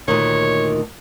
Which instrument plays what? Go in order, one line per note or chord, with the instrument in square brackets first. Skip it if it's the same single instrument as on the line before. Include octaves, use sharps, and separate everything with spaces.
[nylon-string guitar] D2 A#2 D#3 [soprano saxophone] C#5